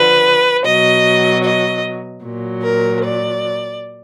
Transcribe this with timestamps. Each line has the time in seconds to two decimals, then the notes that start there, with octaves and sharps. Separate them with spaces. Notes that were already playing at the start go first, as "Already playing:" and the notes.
Already playing: D3 F3 B4
0.64 B2 F#3 D#5
1.43 D#5
2.23 A#2 F#3
2.63 A#4
3.04 D5